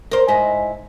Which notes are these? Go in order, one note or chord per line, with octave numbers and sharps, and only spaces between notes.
A#4 C5
G#2 E4 D#5